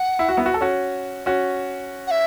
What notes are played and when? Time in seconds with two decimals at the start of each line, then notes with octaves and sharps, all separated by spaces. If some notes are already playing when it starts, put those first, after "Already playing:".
Already playing: F#5
0.19 E4
0.29 F#4
0.37 B3 E4
0.46 F#4
0.54 A4
0.61 C#4 F#4
1.26 C#4 F#4
2.07 F#5
2.11 E5